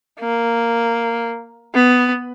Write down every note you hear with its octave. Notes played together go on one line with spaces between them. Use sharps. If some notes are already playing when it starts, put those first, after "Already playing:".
A#3
B3